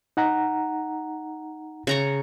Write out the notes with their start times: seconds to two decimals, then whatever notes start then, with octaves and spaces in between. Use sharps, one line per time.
0.17 D#4 F#5 A#5
1.87 C#3 A#5 C#6